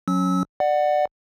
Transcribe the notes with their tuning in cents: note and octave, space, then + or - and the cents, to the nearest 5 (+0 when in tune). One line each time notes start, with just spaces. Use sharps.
F#3 -20 C#4 +0 E6 -25
D5 +20 F#5 +0